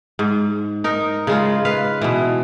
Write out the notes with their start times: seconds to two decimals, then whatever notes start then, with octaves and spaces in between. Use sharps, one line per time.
0.19 G#2
0.84 D#4 A#4
1.27 C#3 G#3 F4
1.65 B4 F5
2.02 B2 E3